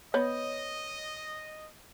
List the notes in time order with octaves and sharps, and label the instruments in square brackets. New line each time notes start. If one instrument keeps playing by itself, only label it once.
[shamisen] B3 [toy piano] C#5 [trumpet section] D#5